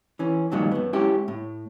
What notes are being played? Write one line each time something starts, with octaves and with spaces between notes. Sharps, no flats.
E3 C#4
G2 A#2 D#3 F3 F#3 G#3
F#2 B3
G#3 C#4 E4 G4
A2